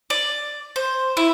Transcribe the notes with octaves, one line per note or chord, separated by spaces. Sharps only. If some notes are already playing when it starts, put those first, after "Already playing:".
D5
C5
E4